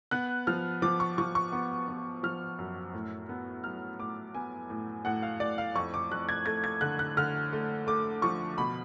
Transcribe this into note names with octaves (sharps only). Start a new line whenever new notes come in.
B3 F#6
F3 F6
F3 D6
C#6
F3 C#6
C#6
B3
B3
F3 F6
F#2
A2
B3
F#3 F6
A2 D6
B3 G#5
A2
A2 F#5
F5
A2 D5
F5
F2 C#6
D6
F2 F#6
G#6
A3 G#6
G#6
D3 F#6
F#6
D3 F6
A3
A3 D6
F3 C#6
B2 B5